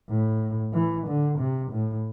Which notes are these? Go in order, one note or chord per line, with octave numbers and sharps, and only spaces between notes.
A2
E3
D3
C3
A2